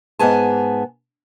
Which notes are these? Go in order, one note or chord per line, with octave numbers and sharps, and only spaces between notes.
G#2 B3 G#4 G#5 A5